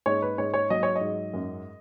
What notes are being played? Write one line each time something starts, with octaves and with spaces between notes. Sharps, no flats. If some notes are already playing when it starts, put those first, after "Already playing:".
G#2 C#5
B4
G#2 C#5
C#5
F#3 D#5
C#5
D#5
G#2
F#2